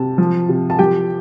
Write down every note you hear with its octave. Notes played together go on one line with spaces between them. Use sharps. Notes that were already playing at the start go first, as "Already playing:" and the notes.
Already playing: C3 A5
F3
C3
A5
F3 G4 G5